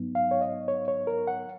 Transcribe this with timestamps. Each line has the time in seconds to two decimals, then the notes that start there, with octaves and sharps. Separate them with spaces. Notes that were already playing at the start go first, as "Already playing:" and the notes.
Already playing: G#2 F#3 B3 D#4
0.15 F5
0.31 C#5
0.41 D#5
0.68 C#5
0.88 C#5
1.07 A#4
1.27 F#5